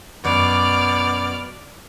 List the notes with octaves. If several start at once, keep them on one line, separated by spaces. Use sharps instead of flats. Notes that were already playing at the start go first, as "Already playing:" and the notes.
F#2 B2 D5 D6 F6